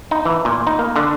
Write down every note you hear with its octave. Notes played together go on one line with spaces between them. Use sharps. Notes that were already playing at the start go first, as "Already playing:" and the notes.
D#4
E3
A#2
D#4
A#3
D3